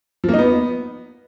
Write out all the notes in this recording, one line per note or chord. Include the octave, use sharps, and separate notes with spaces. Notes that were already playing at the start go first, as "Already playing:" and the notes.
F3
A#3
D#4
B3